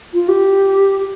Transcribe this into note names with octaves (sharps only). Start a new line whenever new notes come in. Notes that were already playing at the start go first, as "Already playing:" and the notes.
F4
G4